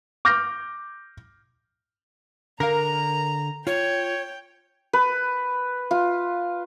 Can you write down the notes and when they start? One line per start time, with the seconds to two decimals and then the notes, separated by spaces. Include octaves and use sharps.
0.25 D6 F6 G6 A#6
2.60 D3 A#4 F5 A#5
3.67 F4 C#5 G5
4.93 B4
5.91 F4